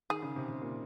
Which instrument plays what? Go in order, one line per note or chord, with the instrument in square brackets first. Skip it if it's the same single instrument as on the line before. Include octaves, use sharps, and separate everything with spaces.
[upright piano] D#3 [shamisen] G#4
[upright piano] C#3
C3
C3
A#2